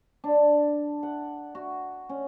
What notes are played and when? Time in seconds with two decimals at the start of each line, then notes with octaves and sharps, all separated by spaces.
0.24 D4
1.03 F#5
1.55 F#4
2.09 C#4